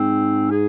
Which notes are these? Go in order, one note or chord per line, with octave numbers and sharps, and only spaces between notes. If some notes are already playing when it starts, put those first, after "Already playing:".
Already playing: G#2 C4
G#4